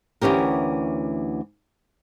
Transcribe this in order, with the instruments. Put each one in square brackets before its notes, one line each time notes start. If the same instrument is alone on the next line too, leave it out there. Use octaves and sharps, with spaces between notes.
[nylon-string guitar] D2 E3 C#4 G4 A#4